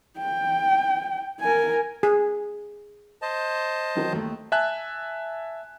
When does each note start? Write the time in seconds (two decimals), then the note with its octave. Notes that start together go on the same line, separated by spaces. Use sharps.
0.18 G5
1.40 A#4 G#5
2.03 G#4
3.22 C5 D#5 A5
3.95 F2 D#3 F#3
4.13 D#2 A3
4.52 E5 G#5 A5 F#6